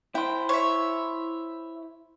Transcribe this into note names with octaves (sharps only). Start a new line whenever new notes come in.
E4 C5 G5
C#5 E5